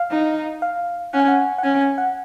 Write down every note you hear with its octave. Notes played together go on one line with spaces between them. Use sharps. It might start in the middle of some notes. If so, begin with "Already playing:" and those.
Already playing: F5
D#4
F5
C#4 F#5
G#5
F#5
F#5
C#4 G#5
G#5
F#5